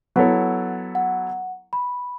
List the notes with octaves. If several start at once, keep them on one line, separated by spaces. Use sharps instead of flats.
F#3 B3 E4 A4 C#5 F#5
F#5
B5